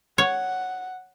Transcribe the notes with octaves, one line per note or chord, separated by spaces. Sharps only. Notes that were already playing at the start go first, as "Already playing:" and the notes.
C#5 F#5